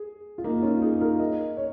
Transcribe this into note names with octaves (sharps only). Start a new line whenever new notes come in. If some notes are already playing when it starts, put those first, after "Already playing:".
Already playing: G#4
F4
A#3 D#4
C#4 F4
D#4 G#4
F4 A#4
A#4 D#5
C#5